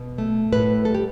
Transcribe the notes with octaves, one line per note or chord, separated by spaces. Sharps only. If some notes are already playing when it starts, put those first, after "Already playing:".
Already playing: B2
A3
A2 B4
G3 A4
G4